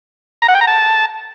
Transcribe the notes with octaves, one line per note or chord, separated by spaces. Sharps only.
A#5
F#5
G5
A#5
A5